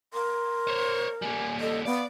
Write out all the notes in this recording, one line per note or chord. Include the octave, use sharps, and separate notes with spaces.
A#4 C6
C5 C#5
G3 A#3 G#5
A4 D#5
B3 D5 F5